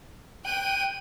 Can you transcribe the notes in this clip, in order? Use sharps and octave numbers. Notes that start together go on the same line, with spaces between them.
G5 F#6 D#7